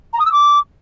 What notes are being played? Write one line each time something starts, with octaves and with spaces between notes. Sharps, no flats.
A#5
D#6
E6
D6